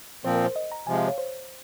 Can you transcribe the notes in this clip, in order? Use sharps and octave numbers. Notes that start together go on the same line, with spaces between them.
A#2 F3 C4 C5
A#4
C5
D#5
A#5
C3 F3 G#3 G#5
F5
C#5
C5